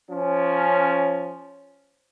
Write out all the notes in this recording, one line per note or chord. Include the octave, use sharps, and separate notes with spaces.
F3 C#4